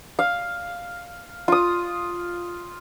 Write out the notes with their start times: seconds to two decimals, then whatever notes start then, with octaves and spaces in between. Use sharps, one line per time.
0.19 F5
1.48 F4 D#6